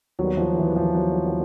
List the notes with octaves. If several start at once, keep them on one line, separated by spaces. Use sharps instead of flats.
D#2 D#3 F#3 G3 B3
F3
E3
F3
F#3